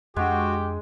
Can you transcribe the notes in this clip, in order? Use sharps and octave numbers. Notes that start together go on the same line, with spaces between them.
F2 G#3 D4 F#4 G4